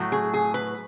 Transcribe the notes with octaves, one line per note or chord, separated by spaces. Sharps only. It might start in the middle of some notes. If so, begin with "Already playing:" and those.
Already playing: A2 F#3 A3
G#4
G#4
B4